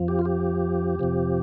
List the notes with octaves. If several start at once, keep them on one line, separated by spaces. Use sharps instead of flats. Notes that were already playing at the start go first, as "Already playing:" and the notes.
Already playing: F2 F3
G4
F4
G4
F2 C3 F3